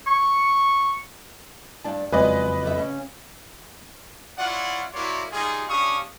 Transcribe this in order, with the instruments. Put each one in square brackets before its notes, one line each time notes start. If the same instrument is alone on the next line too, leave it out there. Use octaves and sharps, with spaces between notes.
[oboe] C#6
[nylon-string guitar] G2 D4 A5
[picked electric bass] F#1 F2 [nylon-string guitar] G#3 B3 [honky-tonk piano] B4 D5 D#5
[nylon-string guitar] F#2 D3 E5
C#3 C#4
[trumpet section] E4 F4 C#5 D5 F#5
A#3 E4 F#4 C#5 D5 C6
G3 D#4 F4 G#4
C#4 D4 G4 F5 C#6 D#6